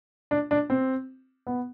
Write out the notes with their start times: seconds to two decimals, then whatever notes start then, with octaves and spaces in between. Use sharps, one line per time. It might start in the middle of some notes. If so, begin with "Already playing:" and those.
0.31 D4
0.51 D4
0.70 C4
1.47 B3